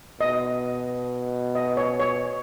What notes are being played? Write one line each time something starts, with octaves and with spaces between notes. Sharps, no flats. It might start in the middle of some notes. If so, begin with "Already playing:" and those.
B2 D#5
D#5
C#5
C#5